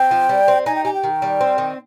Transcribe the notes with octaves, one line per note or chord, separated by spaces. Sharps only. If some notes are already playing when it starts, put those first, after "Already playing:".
Already playing: C4 G5
F3
G3
C4
D#4 G#5
G5
G4 G#5
G5
D#3
G3
C4
D#3